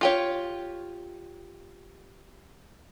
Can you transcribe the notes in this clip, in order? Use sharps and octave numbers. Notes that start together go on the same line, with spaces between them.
F4 G4 C#5